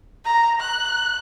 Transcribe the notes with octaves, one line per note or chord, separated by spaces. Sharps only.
A#5
F#6